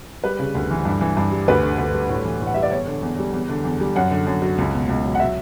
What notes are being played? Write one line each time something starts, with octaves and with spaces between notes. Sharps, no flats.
G3 B4
C#3
D2
E3
G2
E3
G2
G3
D2 B4
D3
D2
G3
A2
E3
A2
F#5
G3 E5
D5
E2 C#5
D3
E2
G3
E2
D3
E2
G3
F#2 F#5
D3
F#2
F#3
C#2
B2
C#2
F#3
F#5
F#3 E5